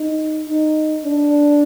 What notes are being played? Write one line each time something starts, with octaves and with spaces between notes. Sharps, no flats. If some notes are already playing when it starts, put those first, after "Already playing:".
Already playing: D#4
D#4
D4